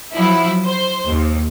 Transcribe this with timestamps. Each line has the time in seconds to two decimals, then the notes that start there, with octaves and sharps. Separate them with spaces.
0.15 F3 F#3 E4
0.63 C5
1.07 D#2